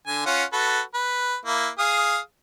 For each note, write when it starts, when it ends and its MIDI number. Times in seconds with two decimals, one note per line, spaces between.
0.07 0.26 50
0.07 0.26 80
0.26 0.44 61
0.26 0.44 65
0.26 0.44 78
0.53 0.80 66
0.53 0.80 69
0.53 0.80 71
0.94 1.36 71
1.46 1.68 58
1.46 1.68 64
1.79 2.18 68
1.79 2.18 77
1.79 2.18 87